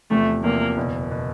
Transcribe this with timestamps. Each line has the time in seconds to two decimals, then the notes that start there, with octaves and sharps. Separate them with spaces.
0.11 E2 C3 F3 A3
0.44 E2 C3 F3 A#3
0.76 F#1 E2 B2
1.11 B2